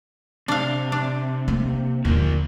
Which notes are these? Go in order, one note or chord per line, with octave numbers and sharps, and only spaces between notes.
C3 D4 F5
D4
A#3
D#2 D3 F3 A#3